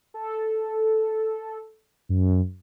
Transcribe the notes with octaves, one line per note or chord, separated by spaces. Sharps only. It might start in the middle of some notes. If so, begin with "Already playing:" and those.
A4
F#2